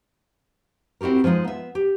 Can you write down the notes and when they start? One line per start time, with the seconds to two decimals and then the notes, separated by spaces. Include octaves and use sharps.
1.01 C4 E4 F#4 G4 A#4
1.24 F3 G3 G#3 D#4 F4
1.44 B3 E5
1.75 G4